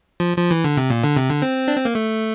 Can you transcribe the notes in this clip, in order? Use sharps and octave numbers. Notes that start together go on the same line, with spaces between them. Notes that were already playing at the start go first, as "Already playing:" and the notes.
F3
F3
E3
D3
C3
A#2
D3
C3
D3
C4
D4
C4
A#3
A3